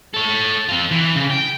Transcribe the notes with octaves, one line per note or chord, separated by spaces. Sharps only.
A4 C#5
C4 F4
E3
C#3
G5